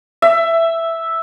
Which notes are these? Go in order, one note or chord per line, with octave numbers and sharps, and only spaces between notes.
E5